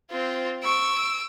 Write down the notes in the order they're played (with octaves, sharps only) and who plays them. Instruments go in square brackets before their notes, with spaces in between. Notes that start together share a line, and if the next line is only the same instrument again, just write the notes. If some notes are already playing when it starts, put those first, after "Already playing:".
[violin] C4 F4
[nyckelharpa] C#6 [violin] E6 D7